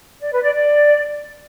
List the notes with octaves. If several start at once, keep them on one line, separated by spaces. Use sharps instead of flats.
D5
B4
D5
D5